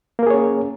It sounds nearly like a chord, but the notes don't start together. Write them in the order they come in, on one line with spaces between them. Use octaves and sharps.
A#3 A#4 G#4 C#5 C#4